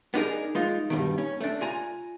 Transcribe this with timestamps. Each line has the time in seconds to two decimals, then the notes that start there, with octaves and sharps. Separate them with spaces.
0.14 B3 D4 D#4 G#4 A#4
0.55 G#3 D#4 F4
0.90 G2 B2 D#3
1.18 C#4
1.41 A3 D4
1.61 F4 G#5 A#5